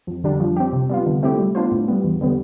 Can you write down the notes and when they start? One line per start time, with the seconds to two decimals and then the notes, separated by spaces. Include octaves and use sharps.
0.07 F2
0.24 D3 G3 D4
0.40 F3
0.56 C4 G4
0.73 C3
0.89 G3 B3 F4
1.06 D3
1.23 A3 C4 E4 G4
1.39 G3
1.55 B3 D4 F4 C5
1.72 A2
1.88 G3 B3
2.04 E2
2.21 D3 G3 B3